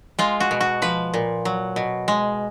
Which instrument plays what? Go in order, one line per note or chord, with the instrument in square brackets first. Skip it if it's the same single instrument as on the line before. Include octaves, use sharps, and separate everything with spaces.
[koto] G#3 F4
F#4
B2
F#4
F3 B4
A#2
F#3
B2
G#3